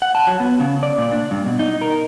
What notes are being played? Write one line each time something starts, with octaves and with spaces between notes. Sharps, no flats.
F#5
A5
F#3
B3
C#3
D5
A#2
D4
G2
B2
D#4
A#4